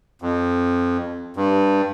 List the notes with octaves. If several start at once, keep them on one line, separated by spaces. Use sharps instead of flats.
F2
G2